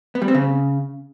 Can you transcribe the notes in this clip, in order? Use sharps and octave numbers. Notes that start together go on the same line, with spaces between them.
B3
G3
C4
C#3